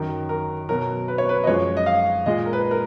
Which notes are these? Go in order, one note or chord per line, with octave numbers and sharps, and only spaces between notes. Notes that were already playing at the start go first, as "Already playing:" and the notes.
Already playing: F#2 D#3 F#3 A#4
A#4
B2 F#3 A#4
B4
C#5
B4
D#5
F#2 F3 G#3 C#5
D#5
F5
A#2 G#3 D#5
A#4
B4
A#4